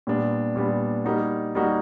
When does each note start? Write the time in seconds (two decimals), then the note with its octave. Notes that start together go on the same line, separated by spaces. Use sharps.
0.07 A#2 G3 B3 D4
0.56 A#2 G3 B3 D4
1.05 G3 A#3 D#4 F#4
1.55 G3 A#3 D#4 F#4